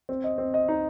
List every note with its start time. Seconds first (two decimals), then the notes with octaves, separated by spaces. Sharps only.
0.09 C4
0.24 D#5
0.38 C4
0.54 D#5
0.68 D#4